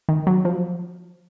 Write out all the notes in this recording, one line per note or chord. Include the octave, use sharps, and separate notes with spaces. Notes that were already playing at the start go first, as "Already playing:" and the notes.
D#3
F#3
F3